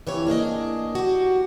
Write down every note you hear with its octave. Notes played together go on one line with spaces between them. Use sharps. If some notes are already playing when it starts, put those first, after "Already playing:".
F2 E3 G4 C#5
A#3 D4 G#4 D#5
F#4 G4